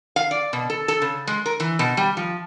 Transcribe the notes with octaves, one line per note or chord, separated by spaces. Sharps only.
F5
D5
B2
A4
A4
C#3
G#3
A#4
E3
B2
G3
F3